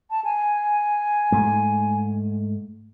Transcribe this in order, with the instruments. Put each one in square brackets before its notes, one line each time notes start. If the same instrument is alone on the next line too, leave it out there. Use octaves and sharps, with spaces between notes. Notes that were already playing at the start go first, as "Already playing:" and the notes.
[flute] A5
G#5
[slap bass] G#2 A3